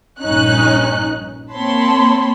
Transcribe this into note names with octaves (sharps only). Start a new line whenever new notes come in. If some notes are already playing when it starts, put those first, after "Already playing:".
A#1 G2 C#4 D#4 F#6
A#3 C4 C#5 A5 B5 C6